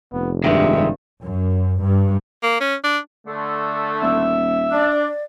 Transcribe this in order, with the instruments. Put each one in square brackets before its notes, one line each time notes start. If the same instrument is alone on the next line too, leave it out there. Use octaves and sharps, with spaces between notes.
[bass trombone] F1 [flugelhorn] B3
[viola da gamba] G2 [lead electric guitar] D#3 G#3 [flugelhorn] E5
[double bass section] F#2
G2
[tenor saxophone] A#3
C#4
D4
[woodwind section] D3 A3
[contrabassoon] D#1 [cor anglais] E5
[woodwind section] D4 [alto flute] D5